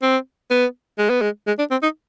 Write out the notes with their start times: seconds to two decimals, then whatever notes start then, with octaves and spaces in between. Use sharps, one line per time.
0.03 C4
0.51 B3
0.99 G#3
1.10 B3
1.22 G#3
1.47 G#3
1.59 D4
1.71 C4
1.83 D#4